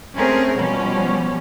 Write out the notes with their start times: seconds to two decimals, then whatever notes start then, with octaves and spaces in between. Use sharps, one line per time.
0.16 A3 C4 C#4 G#4 A#4
0.57 B2 F3 G3 C#4